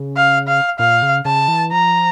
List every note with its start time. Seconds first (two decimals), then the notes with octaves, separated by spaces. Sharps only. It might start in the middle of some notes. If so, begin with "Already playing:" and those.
Already playing: C#3
0.17 F5
0.48 F5
0.79 A#2 F5
1.02 C#3
1.25 C#3 A5
1.48 E3
1.72 F3 A#5